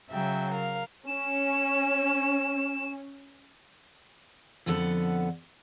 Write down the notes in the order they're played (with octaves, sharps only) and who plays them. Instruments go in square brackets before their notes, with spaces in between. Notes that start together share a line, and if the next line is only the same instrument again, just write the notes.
[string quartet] C#3 F#3 E5 G5
A#4 F5
[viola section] C#4 [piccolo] E7
[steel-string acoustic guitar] F2 D3 F3 B3 A4 F#5